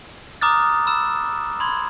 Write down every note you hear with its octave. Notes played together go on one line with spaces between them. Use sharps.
A#5 D6 D#6 F6 F#6 A6
B5 E6 E7
B5 C6 G#6